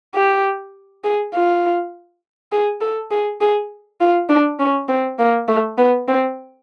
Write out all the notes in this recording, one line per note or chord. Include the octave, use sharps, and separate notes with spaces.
G4
G#4
F4
G#4
A4
G#4
G#4
F4
D4
C#4
C4
A#3
A3
B3
C4